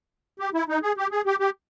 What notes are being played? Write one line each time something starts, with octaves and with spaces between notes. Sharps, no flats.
G4
E4
D#4
G#4
G4
G#4
G4
G4